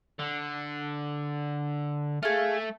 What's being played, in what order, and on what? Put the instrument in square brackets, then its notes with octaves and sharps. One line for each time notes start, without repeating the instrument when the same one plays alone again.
[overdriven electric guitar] D3
[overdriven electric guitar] A3 [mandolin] G#4 F5